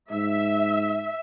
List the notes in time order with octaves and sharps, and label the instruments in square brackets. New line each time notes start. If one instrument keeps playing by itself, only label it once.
[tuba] G#2 [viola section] E5